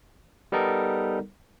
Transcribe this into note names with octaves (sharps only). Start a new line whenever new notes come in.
G3 B3 D#4 A4 A#4